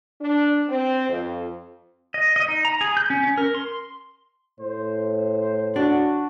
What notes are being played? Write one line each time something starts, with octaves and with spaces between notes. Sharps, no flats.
D4
C4
F2
D#5
D#5
D#4
A#5
G#4
G6
C#4
C#4
A#4
C6
A2 C5
D4 F#4